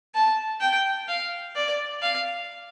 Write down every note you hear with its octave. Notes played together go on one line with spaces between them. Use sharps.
A5
G5
F5
D5
F5